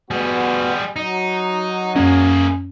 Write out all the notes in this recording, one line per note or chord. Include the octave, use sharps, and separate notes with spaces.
G3 B3 F#4 G#4
F#3 D#4
F#2 A#3 C#4 G#4